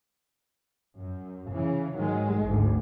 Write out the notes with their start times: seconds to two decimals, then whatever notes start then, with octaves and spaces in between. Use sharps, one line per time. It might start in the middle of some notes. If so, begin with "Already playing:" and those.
0.97 F#2
1.54 C#3 E3
1.98 G#2 D#3 F#3 G#3
2.46 G#1 D2 G#2